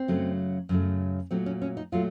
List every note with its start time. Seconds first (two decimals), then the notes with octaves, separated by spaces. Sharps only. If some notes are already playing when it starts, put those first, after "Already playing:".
Already playing: C4
0.08 F#2 C#3 F#3 A3
0.69 F#2 C#3 F#3 A3
1.31 A#2 F#3 A3 C4
1.46 C#4
1.62 C#4
1.77 D#4
1.92 A#2 F#3 A3 F4